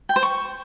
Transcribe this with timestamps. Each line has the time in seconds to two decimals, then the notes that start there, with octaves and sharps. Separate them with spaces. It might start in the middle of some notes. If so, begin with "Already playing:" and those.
0.09 G5
0.16 C5
0.23 C#6